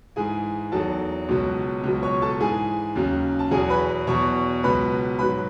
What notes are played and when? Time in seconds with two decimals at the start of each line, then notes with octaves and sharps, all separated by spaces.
0.16 G#2 E3 G#4 G#5
0.72 E2 D#3 F#3 A4 A5
1.29 C#2 B2 F#3
1.84 C#2 B2 F#3
2.02 C#5 C#6
2.22 A4 A5
2.40 G#2 E3 G#4 G#5
2.95 D#2 C#3 F#3
3.39 A5
3.51 E2 B2 F#3 G#4 G#5
3.70 B4 B5
4.07 E2 B2 F#3 C#5 C#6
4.63 C#2 B2 F#3 B4 B5
5.19 G#2 F#3 B4 B5